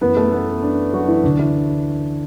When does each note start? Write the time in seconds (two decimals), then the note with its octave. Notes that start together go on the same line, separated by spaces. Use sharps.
0.01 F#2 E3 B3 B4
0.16 A3 A4
0.32 B3
0.62 D4
0.93 F#3 F#4
1.08 E3 E4
1.24 D2 D3 D4
1.39 E3 E4